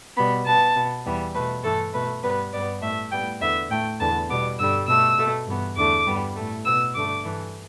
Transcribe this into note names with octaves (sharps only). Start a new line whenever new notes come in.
B2 G3 B3 B5
B2 B3 A5
B2 B3
E2 E3 G3 B3
B2 A3 B4
G2 E3 A3 A4
B2 A3 B4
G2 G3 B3 B4
G2 G3 B3 D5
A2 A3 E5
A2 G3 B3 G5
E2 D3 B3 E5
A2 A3 G5
E2 D3 B3 A5
B2 G3 B3 D6
G2 D3 G3 E6
B2 A3 E6
B2 A3
G2 E3 B3
E2 D3 A3 D6
G2 G3 B3
A2 A3
B2 B3 E6
G2 D3 A3 D6
G2 E3 A3